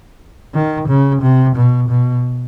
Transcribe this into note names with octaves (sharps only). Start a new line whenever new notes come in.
D#3
C#3
C3
B2
B2